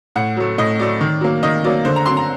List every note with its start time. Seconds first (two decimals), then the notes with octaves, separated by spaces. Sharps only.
0.16 A2 F#5
0.37 F#3 A3
0.58 A2 D#5
0.79 F#3 A3 D5
1.01 D#3
1.21 F#3 A#3
1.43 D#3 D#5
1.64 F#3 A#3 D5
1.85 D3 C5
1.96 A#5
2.06 F#3 C4 C6
2.17 A#5